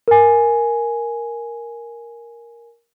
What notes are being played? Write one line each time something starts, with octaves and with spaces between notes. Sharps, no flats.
A#4 G#5